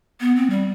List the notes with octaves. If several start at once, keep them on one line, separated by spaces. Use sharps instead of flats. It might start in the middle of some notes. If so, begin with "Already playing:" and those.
B3
C4
G3